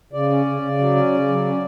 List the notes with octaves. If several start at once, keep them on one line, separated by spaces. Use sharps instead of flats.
C#3 D5
C#4
C#3
C#3
F#3
C#4
C#3
F#3
C#4